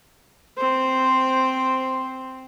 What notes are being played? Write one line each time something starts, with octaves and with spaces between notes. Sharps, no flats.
C4 C5